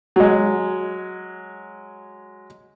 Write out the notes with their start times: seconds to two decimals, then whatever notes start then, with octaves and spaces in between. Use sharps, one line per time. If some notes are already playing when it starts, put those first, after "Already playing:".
0.16 F#3 G#3